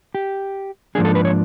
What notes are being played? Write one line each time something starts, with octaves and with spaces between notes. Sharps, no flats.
G4
G#2 F3 A#3 D4 G#4
A4
B4
C#5